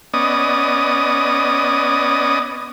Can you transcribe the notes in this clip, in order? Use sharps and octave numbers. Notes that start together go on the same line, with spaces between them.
B3 C#4 D5 D#5 D#6